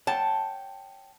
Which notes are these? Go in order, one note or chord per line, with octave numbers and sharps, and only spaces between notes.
C#5 F#5 G5 A5